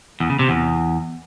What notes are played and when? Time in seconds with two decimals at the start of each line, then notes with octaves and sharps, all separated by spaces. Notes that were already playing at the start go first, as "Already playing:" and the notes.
0.20 E2
0.30 C#3
0.39 C3
0.49 E2